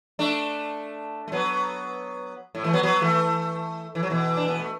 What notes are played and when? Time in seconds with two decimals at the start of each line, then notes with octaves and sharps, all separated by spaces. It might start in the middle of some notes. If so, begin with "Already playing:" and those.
0.19 A3 D4
1.28 A3
1.32 F#3 B3
2.55 A2
2.64 E3 A3
2.73 F#3 B3
2.83 F#3 B3
3.01 E3 A3
3.95 E3
4.03 F#3
4.10 B2 E3
4.37 D4
4.48 B3
4.60 A3